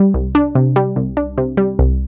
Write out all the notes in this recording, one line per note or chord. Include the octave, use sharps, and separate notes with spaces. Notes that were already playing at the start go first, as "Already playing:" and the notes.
Already playing: G3
C2
D4
C3
G3
C2
D4
C3
G3
C2